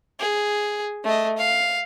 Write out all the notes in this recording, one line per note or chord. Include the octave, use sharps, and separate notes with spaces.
G#4
A3 D#5
F5